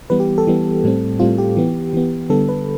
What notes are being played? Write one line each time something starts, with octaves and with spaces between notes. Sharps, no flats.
E3 G3 B3 B4
G4
A4
E3 G3 B3
A2 G3 C4
A2 G3 C4 F4
G4
E3 B3
E3 B3
D3 G3 B3 A4
B4